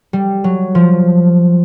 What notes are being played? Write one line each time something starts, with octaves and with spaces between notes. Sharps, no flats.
G3
F#3
F3